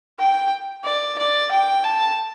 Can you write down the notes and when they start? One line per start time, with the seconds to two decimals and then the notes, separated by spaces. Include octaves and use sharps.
0.19 G5
0.84 D5
1.18 D5
1.51 G5
1.84 A5